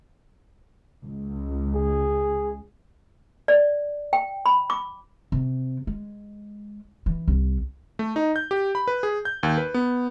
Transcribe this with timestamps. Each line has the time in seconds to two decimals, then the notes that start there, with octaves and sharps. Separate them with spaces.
1.02 C#2
1.75 G#4
3.48 D5
4.13 G5
4.46 B5
4.70 D6
5.32 C3
5.87 G#3
7.06 E3
7.28 C2
7.99 A3
8.16 D#4
8.36 G6
8.51 G4
8.75 B5
8.88 B4
9.03 G#4
9.25 G6
9.43 D#2
9.58 B4
9.74 B3